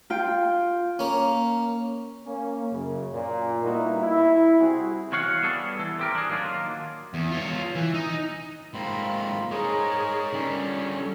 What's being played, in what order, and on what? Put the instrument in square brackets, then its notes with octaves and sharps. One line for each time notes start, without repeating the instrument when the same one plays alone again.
[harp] F4 G5
[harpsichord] A#3 C#4
[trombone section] A#3 C#4
F#2 C#3
A#2
G3 A#3 B3 D#4 E4 F#4
E4
C3 G3 C4 F#4 G#4
[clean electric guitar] E2 F#4 C#5 F5 F#5
G3 B3 G#4 A4
E3 A4
C4 G4 A#4
D4 G#4
D#3 F#3 A#3 D4 F4
[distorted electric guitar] E2
F4 C#5
E3
D#4
[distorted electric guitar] G#2 A#3 [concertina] C4 F4 B5
[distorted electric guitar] D#4 C5 [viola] G#4 [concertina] A#4 C#5
[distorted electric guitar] D3 G3 [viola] C#4